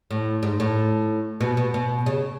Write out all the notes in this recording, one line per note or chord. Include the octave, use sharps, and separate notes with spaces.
A2
G#2
A2
B2
B2
B2
C#3